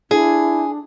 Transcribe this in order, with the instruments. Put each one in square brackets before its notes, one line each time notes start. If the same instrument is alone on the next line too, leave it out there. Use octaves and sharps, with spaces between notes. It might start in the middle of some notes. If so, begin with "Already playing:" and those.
[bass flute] D4 [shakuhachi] E4 [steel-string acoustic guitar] G#4